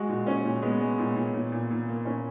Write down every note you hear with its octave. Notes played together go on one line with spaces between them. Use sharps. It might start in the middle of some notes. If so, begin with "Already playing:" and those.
Already playing: G#3 F#4
A#2
A#2 C#4
A#2
G#3 B3
G#3
A#2
A#2
A#2
A#2
A#2
A#3
A#2 C#4